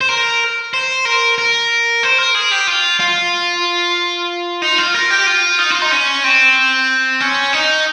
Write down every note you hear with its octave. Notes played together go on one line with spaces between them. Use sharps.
C5
A#4
C5
A#4
A#4
C5
A#4
G#4
G4
F4
F4
D#4
F4
A#4
G4
F4
D#4
F4
D#4
C#4
C4
C#4
D#4